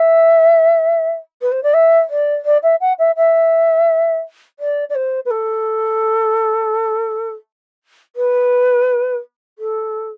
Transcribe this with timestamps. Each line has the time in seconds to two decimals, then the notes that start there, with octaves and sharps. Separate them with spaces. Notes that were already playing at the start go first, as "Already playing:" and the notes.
Already playing: E5
1.42 B4
1.52 C5
1.63 D5
1.74 E5
2.10 D5
2.45 D5
2.63 E5
2.81 F#5
2.99 E5
3.16 E5
4.59 D5
4.90 D5
4.95 C5
5.25 B4
5.31 A4
8.16 B4
9.59 A4